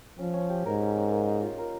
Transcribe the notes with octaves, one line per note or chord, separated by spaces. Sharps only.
F3 C#4
C#4
G4
G#2 A#4
C#4
C#4
A#3
D#5
F4
A#4